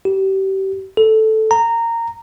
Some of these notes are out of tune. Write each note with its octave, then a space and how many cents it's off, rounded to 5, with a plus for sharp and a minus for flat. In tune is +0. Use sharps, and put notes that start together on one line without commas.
G4 -30
A4 -5
A#5 -15